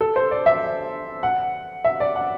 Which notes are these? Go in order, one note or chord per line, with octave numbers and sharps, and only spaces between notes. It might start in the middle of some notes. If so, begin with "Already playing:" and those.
A4
C5
D5
E5
F#5
E5
D5
F#5